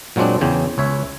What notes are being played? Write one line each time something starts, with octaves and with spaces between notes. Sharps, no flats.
A#2 F#3 G#3 C4 D4
E2 C#3 G5 G#5
C#2 C#5 E5